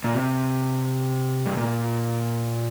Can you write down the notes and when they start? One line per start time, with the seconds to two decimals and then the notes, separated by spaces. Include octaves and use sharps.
0.04 A#2
0.15 C3
1.46 G2
1.57 A#2